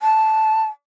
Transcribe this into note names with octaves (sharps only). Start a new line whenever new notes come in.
A5